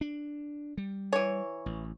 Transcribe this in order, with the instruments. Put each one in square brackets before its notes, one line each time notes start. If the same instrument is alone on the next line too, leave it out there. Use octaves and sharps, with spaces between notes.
[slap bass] D4
G3
[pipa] E3 C#5
[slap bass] A1